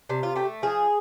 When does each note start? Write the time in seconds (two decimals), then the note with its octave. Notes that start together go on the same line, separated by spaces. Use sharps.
0.09 C3 D4
0.23 F4
0.35 A3 G4
0.62 F3 G#4